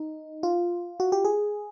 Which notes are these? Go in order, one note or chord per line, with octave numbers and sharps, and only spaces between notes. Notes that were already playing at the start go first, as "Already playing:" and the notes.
Already playing: D#4
F4
F#4
G4
G#4